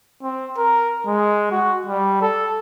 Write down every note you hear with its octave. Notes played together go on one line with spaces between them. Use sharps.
C4
A#4
G#3
F#4
G3
A4